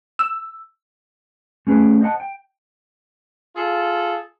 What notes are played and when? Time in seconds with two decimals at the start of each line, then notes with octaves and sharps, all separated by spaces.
0.19 E6
1.67 A3 C#4 G#4 B4 D5
2.01 C5 D#5 E5 F#5 A5
2.20 G5
3.56 F4 G#4 A4